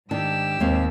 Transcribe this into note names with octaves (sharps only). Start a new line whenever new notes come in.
G#2 D#3 D4 G4 A5 E6
D#2 G#3 C4 F5